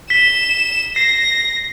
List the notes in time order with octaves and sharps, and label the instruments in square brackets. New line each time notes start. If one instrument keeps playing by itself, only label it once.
[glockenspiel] B6 G7 [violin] E7
[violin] A#6 [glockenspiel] C7